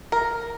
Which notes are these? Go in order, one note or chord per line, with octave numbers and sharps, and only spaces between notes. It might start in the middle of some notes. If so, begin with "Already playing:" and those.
A#4